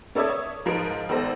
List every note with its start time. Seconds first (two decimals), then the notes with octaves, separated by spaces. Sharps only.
0.15 C#4 A4 D5 E5 D#6 G#6
0.29 C#5
0.65 G#2 F3 A#4 B4 D7
1.09 G#1 B3 A4 C5 A#6